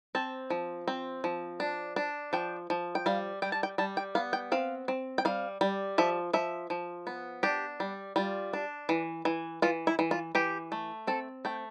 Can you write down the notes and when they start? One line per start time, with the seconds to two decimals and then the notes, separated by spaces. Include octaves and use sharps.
0.15 C4 A5
0.50 F3
0.88 C4
1.24 F3
1.60 D4
1.96 D4
2.33 F3 G5
2.70 F3
2.95 G5
3.06 G3 F5
3.42 G3 G5
3.52 A5
3.63 G5
3.78 G3 A5
3.97 G5
4.15 B3 F5
4.33 G5
4.52 C4 F5
4.88 C4
5.18 G5
5.25 G3 F5
5.61 G3
5.98 F3 E5
6.33 F3 E5
6.70 F3
7.07 B3
7.43 D4 G4
7.80 G3
8.16 G3 F4
8.53 D4
8.89 E3
9.25 E3
9.62 E3 F4
9.87 E4
9.99 E3
10.11 F4
10.35 E3 G4
10.72 A3
11.07 C4 A4
11.45 A3 G5